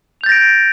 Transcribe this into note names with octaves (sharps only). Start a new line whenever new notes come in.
G6 A6 A#6 D7 F7